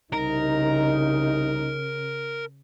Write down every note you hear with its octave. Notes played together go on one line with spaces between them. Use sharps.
C2 C#3 D#4 A#4